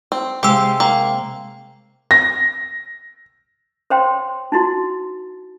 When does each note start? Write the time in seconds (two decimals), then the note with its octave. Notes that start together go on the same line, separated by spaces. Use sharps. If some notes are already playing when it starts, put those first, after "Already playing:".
0.12 C4
0.43 C3 G#3 G4 F5 G5 E6
0.80 A#3 G5
2.11 A#6
3.90 C5 C#5 G5 C6
4.52 D#4 E4 F#4